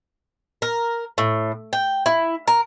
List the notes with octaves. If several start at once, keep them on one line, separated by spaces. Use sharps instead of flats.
A#4
A2
G5
E4
A#4